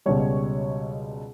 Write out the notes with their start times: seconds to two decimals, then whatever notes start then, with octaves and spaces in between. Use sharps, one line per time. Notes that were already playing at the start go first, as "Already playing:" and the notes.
0.06 C#2 B2 G3 C#5